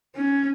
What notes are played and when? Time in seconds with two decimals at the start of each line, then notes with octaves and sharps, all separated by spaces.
0.15 C#4